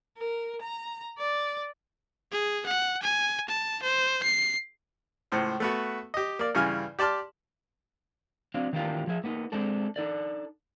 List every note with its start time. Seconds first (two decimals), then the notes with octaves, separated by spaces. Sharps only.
0.18 A#4
0.61 A#5
1.18 D5
2.32 G#4
2.66 F#5
3.03 G#5
3.49 A5
3.83 C5
4.23 C7
5.32 C#2 A2 C5
5.60 A3 B3 F#4
6.14 G4 D#5
6.39 A#3 D5
6.55 G2 C#3 E3 F4 G#5 F6
6.99 G4 D5 A5 C6 F6
8.54 F#3 C4 D4 F5
8.73 D#3 E3 A#3 D4 F4 G4
9.07 F3 G#4 E5
9.24 A#3 B3 C#4 D#4
9.52 G#3 C4 D4 A4
9.96 D4 D#4 A4 D5